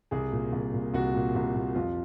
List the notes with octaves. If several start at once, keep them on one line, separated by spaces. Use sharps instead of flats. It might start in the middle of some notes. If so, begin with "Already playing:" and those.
C2 G#4
A#2
C2
A#2
C2 F#4
A#2
C2
A#2
F2 F4